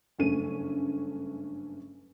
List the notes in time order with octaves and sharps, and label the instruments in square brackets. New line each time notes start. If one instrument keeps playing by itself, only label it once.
[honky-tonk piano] F#1 G2 A3 C#4 D#7